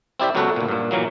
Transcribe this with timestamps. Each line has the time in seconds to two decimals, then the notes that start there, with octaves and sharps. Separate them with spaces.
0.20 C4 E4 G4 D5 E5
0.35 C#2 F#3 B3 F#4 A4 B4
0.56 D2 A#2
0.68 G2 A#2
0.91 A#2 E3 F#3 A#3